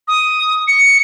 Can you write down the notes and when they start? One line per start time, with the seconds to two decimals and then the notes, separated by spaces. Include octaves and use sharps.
0.08 D#6
0.68 C#7